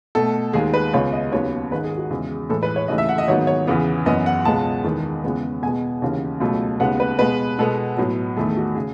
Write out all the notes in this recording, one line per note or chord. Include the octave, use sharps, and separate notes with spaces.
B2 A3 A4
D#2 D#3 G#3 G#4
B4
C#2 C#3 G#3 B3 C#5
D#5
D#2 C#3 F#3 B3 C#5
G#2 D#3 G#3 B4
G#4
F#4
E2 C#3 E3 G#3
A2 E3 G#3 A4
B4
C#5
D#2 C#3 E3 A3 D#5
E5
F#5
D#5
G#2 D#3 F#3 B3 C#5
C#5
E2 C#3 E3 B3
F#2 E3 B3 D#5
F#5
C#2 B2 G#3 B3 A5
E2 D#3 G#3 B3
E2 C#3 G#3 B3
B2 G#3 B3 G#5
D#2 C#3 E3
C#2 B2 F#3 A3
D#2 C#3 G#3 B3 F#5
B4
B2 G#3 B3 B4
B2 G#3 B3 A4
A2 F#3 B3
E2 D#3 A3 G#4
F#4
C#3 G#4